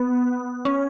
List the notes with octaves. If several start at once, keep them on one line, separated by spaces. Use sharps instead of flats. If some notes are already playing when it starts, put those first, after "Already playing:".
Already playing: B3
C#4